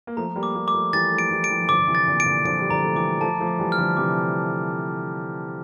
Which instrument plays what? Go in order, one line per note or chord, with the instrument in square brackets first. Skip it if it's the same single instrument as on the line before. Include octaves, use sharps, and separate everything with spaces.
[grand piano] A#3
[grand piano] F3 A3 [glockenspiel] A#5
[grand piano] G3 A#3
[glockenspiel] D6
[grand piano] G3 A#3
[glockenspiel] D6
[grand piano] F3 A3
[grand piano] E3 G3 [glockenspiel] A6
[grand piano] F3 A3
[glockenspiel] D7
[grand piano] E3 G3
[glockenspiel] D7
[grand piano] E3 G3
E3
[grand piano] D3 F3 [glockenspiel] D6
[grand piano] D3
C3 E3
[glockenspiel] A6
[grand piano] A#2 D3
[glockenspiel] D7
[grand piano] A#2 D3
[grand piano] D3 F3 [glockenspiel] D7
[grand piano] G3
[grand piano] D3 F3 [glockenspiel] A#5
[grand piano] A3
[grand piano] E3 G3 [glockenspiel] D6
[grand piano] F3 A3 [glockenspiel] A5
[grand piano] F3 A3
[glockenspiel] D6
[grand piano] E3 G3
[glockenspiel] F6
[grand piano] D3 F3
[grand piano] C3 E3 [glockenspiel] D6